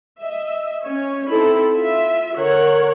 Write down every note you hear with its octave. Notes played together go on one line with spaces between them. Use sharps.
D#5 E5
C#4 C#5
C4 D#4 E4 A4 B5
F4 E5
D3 A#4 C#5 F#5